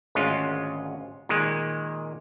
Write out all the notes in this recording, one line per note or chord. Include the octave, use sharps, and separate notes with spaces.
G#1 D2 G#3 C#4 F4
A#2 D#3 G#3